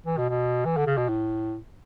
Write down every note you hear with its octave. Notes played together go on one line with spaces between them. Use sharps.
E3
B2
B2
E3
D3
C#3
B2
A2